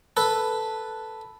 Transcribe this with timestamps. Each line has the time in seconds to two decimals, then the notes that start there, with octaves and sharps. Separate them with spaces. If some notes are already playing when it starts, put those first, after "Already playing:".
0.17 A4 B4